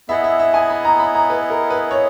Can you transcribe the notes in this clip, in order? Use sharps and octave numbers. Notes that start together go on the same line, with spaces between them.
B3 E4 G#4 D#5 E5 F#5
E5
E5
G#5
B5
A#5
B5
A#5
B4
A#4
B4
C#5